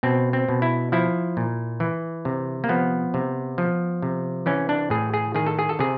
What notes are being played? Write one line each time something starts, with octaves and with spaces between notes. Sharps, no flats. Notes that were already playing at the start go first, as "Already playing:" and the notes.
B2 C4
C4
B2
E4
F3 E4
A#2
E3
C3
A#3
F3 B3
C3
F3
C3
E3 C#4
D4
A2 G#4
G#4
D#3 G#4
A4
G#4
A4
C3 G#4